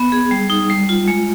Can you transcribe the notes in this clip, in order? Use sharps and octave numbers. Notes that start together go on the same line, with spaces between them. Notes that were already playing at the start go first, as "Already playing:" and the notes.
Already playing: B3
G#4
G3
D#4
G3
F4
G#3